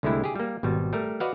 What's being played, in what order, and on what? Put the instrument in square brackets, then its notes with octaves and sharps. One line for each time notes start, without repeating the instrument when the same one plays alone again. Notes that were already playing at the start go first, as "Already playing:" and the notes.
[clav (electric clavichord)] C2 D3 G#3 A3 E4 G4
G4 G#4
G3 A#3
G#1 B2 G3
G3 A3 A#4
F#4 B4 D5 D#5 F5 F#5